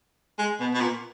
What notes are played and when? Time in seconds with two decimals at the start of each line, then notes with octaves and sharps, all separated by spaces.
0.39 G#3
0.60 B2
0.74 B2
0.81 A#2